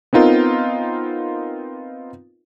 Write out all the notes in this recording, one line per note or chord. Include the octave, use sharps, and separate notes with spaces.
B3 C4 D#4 F4 A#4